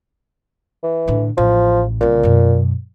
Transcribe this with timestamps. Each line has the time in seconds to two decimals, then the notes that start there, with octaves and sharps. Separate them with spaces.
0.83 E3
1.08 A2 D3
1.38 A1 F3
2.01 C2 A#2 C#3
2.23 F#2 B2